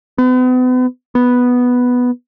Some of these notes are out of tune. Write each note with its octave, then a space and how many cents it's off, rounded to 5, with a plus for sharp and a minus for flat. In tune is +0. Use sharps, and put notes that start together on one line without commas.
B3 +40
B3 +0